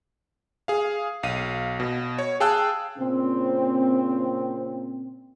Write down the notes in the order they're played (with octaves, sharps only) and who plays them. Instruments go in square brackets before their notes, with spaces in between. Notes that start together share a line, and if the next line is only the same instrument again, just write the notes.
[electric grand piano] G#4 F5
B1 F5 D#7
B2
C#5
G#4 F5 G5 A5 E6 F#6
[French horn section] A#2 C#3 C4